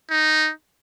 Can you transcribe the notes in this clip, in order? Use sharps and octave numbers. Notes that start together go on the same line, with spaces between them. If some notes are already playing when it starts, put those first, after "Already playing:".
D#4